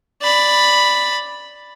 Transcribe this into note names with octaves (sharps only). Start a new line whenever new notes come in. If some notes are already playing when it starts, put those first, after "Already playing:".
D5 B5